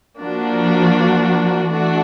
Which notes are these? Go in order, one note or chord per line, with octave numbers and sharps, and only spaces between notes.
F3 A#3 D4 F#4
E3 A3 D4 F#4